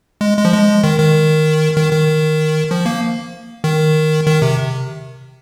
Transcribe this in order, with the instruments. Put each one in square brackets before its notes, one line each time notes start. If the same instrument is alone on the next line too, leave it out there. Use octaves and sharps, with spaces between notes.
[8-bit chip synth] G#3
G#3
F3
G#3
D#3
D#3
D#3
D#3
F3
A#3
D#3
D#3
C3